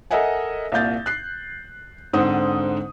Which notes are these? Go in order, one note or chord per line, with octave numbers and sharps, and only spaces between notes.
A4 A#4 D#5 E5 F#5 G#5
C2 A#2 F5 G6 A6
F#6 C7
G#2 D3 C4 F#5 D#6